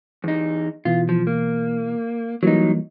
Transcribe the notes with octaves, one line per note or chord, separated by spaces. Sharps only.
E2 D#4
B2 E3 F4
F3
A#3
E3 F#3 G3 A#3 D#4